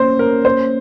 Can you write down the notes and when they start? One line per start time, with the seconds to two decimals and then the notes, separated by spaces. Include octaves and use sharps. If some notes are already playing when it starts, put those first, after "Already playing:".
Already playing: A#3 C#4 C5 C#5
0.19 A#4 C#5
0.45 C#4 C5